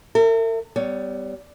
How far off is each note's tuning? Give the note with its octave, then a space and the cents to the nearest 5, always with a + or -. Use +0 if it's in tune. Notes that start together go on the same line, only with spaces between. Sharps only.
A#4 -45 E5 +10
G3 -5 B3 +30 C#5 +15